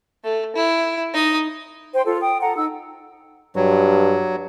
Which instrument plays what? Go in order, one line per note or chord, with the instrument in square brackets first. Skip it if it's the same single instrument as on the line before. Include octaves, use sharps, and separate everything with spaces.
[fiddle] A3
E4
D#4 D#6
[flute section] C5 G5 C6
F4 A4
G5 D#6
A4 F#5 A#5
D#4 E6
[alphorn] G2 [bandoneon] F#3